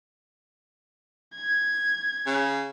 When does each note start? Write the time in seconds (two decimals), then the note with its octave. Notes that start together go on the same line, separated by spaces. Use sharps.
1.35 G#6
2.26 C#3